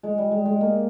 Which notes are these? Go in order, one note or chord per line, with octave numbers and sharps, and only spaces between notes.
G#3
G3
G#3
G#3
A#3